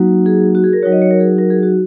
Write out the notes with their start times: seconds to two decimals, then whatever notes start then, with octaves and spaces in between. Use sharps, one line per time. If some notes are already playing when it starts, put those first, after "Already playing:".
Already playing: F#3 A#3 D#4 F#4
0.26 G#4
0.55 F#4
0.64 G#4
0.73 A#4
0.82 F#3 D#4 F#4 C#5
0.92 D#5
1.02 C#5
1.11 A#4
1.20 G#4
1.38 A#4
1.50 G#4
1.63 F#4